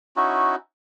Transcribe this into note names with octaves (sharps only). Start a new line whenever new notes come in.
C#4 D#4 E4 F#4